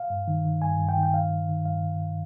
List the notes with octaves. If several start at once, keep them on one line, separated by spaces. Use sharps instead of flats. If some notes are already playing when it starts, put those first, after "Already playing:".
Already playing: F5
G2
D#3
D#3
G2 G#5
G2
G5
D#3
G5
G2 F5
D#3
D#3
G2 F5